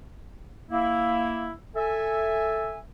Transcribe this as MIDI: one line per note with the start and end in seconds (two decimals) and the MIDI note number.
0.71 1.52 58
0.71 1.52 64
1.75 2.78 69
1.75 2.78 76
1.75 2.78 80